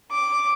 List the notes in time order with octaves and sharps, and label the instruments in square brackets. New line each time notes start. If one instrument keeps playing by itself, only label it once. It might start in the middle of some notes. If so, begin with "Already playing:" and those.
[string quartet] D6